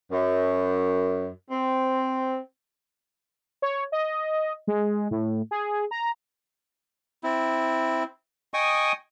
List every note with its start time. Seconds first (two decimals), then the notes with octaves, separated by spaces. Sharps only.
0.11 F#2
1.51 C4
3.62 C#5
3.92 D#5
4.67 G#3
5.11 A2
5.51 G#4
5.91 A#5
7.24 C4 E4
8.54 D#5 G5 G#5 C#6 D#6